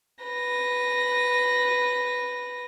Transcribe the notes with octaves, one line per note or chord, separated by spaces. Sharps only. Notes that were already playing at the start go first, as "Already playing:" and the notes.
B4 A#6